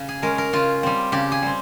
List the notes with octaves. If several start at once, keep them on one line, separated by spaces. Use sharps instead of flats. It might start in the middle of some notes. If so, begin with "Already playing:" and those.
Already playing: C#3
G#4
G#3 C#4 A#4
A#4
C#3 F4
G3 C4
C#3 G4
G#4
G3 C4